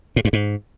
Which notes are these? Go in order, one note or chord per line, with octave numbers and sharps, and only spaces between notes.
A2
G2
G#2